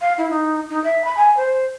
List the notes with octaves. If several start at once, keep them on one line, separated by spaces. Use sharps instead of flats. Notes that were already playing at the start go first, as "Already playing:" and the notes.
F5
E4
D#4
D#4
E5
B5
G#5
C5